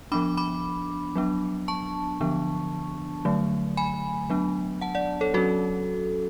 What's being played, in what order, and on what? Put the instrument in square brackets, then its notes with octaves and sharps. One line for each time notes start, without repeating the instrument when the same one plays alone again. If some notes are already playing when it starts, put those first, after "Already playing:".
[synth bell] F3 B3 D4 B5 D6
B5 D6
F#3 B3 D4
A5 C#6
D3 F3 B3 D4
D3 F#3 A3
G#5 B5
F#3 B3 D4
F#5 A5
D5 F#5
A4 C#5
F#3 C#4 F#4 A4